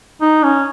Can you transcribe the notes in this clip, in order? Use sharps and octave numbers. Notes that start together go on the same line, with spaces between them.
D#4
C#4